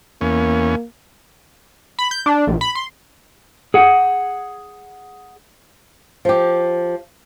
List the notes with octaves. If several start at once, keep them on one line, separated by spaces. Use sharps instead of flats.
E2 A#3 C#4
B5
G6
D4
A#1
B5
C6
G#4 F#5
F3 G4